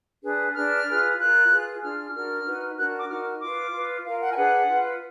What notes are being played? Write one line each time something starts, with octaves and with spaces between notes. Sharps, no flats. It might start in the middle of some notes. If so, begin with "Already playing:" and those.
D4 G#4 B4
D4 G#4 B4 F6
F4 G#4 B4
F4 A#4 F#6
F4 G#4 B4
D4 F4 G#4 F6
F6
D4 F#4 A#4 F6
D#4 F#4 B4
D4 F#4 A#4 F#6
D6
D#4 F#4 A#4 F6
F4 B4 D6
F4 B4
F4 A#4 F5
F#5
G#5
D4 G#4 B4 F#5
F4 B4